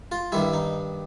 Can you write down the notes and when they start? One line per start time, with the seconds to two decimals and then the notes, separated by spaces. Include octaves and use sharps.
0.12 F4
0.32 G2 D#3 G3 E4
0.53 D#4